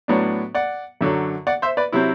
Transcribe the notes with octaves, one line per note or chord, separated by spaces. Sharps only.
A2 F#3 B3 D4
D5 F#5
F#2 D3 F#3
D5 F#5
C5 E5
B4 D5
C3 F#3 C4 E4